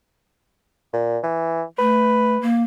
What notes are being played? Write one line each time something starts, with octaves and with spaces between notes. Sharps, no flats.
A#2
E3
A3 B4
A#3